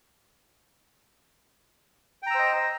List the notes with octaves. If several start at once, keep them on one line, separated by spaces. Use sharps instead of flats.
C5 D#5 G5 A#5 E6